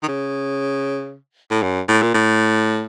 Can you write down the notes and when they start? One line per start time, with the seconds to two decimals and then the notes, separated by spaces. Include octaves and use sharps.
0.03 D#3
0.08 C#3
1.51 A2
1.63 F#2
1.88 A2
2.03 A#2
2.14 A2